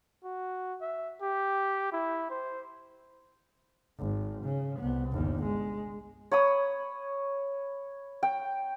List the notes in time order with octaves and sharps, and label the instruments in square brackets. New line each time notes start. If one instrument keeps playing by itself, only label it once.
[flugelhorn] F#4
E5
G4
E4
C5
[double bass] G#1
C#3
C2 B3
G1 D#2
G#3
[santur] C#5 B5 D#6
G5